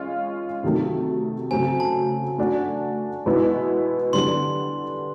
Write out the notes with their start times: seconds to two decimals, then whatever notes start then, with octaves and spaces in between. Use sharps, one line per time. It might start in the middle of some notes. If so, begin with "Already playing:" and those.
Already playing: G#3 C#4 F4
0.63 C3 D#3 F#3 A3
1.51 C#3 F#3 A3 C4 G#5
1.80 A5
2.38 A3 D4 F#4
3.26 B2 G#3 B3 E4
4.13 D3 G3 B3 D4 C6